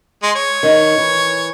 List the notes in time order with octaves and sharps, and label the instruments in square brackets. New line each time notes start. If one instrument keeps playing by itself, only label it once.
[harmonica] G#3 C6
C#5
[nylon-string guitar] D#3 D#4
E3